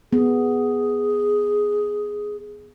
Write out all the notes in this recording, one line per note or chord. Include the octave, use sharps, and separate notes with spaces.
B3 G#4